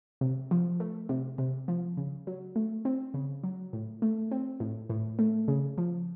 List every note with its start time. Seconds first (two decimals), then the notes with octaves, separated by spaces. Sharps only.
0.21 C3
0.51 F3
0.80 A3
1.09 C3
1.38 C3
1.68 F3
1.97 C#3
2.27 F#3
2.56 A3
2.85 C4
3.14 C#3
3.44 F#3
3.73 A2
4.02 A3
4.31 C4
4.60 A2
4.90 A2
5.19 A3
5.48 C#3
5.78 F3